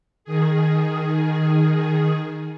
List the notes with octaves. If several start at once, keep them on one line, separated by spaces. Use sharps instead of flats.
D#3 G#4